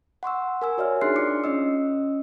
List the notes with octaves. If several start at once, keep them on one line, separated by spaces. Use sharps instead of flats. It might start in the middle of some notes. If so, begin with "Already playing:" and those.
F#5 C6 C#6 E6
A#4 G#5 E6
F#4 C#5 D5 E5 F6
D4 D#4 G#4 C6 F#6 C7
F4 D6 C#7
C#4 D#5 E6